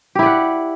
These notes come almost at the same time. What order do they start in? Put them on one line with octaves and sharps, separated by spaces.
G4 E4 D5 F#5